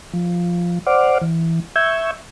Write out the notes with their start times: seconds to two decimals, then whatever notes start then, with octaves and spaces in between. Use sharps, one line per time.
0.13 F3
0.86 C5 D5 F#5 D6 F6
1.21 E3
1.76 E5 C#6 E6 G6 G#6